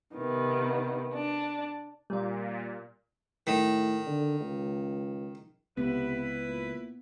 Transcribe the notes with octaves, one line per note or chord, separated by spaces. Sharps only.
C3 D#3 B3
D4
A#2 G3 D5
A2 D#3
D3
C#2
C#2 C3 B3 E4 B4
A#2